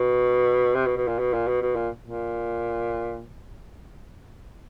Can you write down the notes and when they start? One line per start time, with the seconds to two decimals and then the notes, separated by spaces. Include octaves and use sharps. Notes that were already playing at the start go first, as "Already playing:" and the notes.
Already playing: B2
0.75 C3
0.86 B2
0.97 B2
1.08 A#2
1.19 B2
1.33 A#2
1.48 B2
1.62 B2
1.76 A#2
2.03 A#2